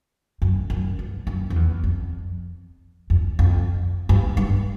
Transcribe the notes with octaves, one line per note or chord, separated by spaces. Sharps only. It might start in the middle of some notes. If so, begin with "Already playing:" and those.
F#2
F#2
G2
F#2
F2
E2
F2
F2
F2
G2
G2